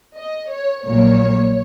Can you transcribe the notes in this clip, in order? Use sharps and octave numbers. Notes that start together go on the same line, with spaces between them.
D#5
C#5
A#1 A#2 F#3 A#3 C#5